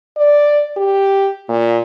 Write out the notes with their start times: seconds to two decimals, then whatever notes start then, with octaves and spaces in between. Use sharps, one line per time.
0.17 D5
0.77 G4
1.49 A#2